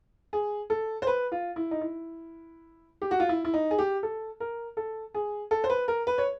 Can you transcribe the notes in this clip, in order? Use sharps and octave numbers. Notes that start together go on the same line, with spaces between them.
G#4
A4
C5
B4
F4
E4
D#4
E4
G4
F#4
F4
E4
E4
D#4
G#4
G4
A4
A#4
A4
G#4
A4
C5
B4
A#4
B4
C#5